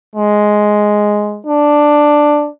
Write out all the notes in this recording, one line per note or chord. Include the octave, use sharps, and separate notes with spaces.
G#3
D4